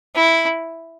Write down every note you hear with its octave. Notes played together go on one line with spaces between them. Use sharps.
E4